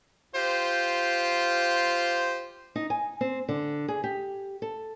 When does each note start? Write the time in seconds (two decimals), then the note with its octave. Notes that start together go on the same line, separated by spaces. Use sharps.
0.35 F4 G4 C5
2.76 D#4
2.90 G#5
3.21 C4
3.49 D3
3.88 G#4
4.04 G4
4.62 A4